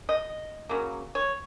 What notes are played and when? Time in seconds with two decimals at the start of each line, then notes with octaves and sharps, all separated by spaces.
0.09 D#5
0.69 C#3 F#3 A#3
1.15 C#5